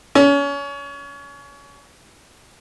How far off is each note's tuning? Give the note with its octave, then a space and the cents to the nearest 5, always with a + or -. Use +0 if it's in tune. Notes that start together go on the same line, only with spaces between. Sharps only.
C#4 +30